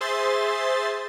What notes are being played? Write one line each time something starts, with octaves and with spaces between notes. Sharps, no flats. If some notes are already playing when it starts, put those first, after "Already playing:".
G#4 C5 E5 C6 A6